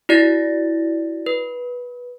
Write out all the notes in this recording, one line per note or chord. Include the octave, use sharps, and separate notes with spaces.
E4 F#4 D5 A6 A#6
B4